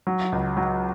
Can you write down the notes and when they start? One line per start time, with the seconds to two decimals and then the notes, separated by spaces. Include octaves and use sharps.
0.07 F#3
0.32 C#2
0.57 F#3